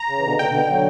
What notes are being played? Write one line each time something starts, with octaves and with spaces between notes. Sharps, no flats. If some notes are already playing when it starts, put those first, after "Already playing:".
Already playing: A#5
C#3
E3
B2 D3
B2 D3 G5
B2 D3
D3 F#3